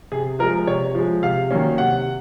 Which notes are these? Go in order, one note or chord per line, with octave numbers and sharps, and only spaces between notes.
C3 G#4
F3 G#3 A#4
C3 C#5
F3 G#3
C3 F5
D#3 F#3 A#3 C#4
C3 F#5